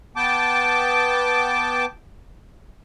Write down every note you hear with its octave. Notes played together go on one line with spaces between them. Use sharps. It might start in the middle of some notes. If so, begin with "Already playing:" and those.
B3 G5 A5 D6